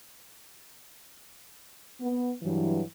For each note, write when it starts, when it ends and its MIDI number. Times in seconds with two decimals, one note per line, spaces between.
2.01 2.30 59
2.42 2.79 43
2.42 2.79 52
2.42 2.79 54